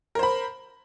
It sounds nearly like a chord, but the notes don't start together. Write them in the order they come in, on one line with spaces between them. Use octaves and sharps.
A#4 C5 B5